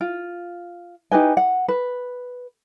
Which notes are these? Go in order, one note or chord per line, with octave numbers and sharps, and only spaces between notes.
F4
D#4 G4 B4 G#5
F#5
B4